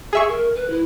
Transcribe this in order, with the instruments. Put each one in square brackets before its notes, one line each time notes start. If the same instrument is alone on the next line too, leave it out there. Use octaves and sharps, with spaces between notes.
[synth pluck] G#4 E5 C#6
[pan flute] A#4
B4
E4